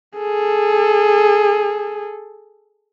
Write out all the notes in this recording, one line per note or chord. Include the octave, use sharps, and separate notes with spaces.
G#4 A4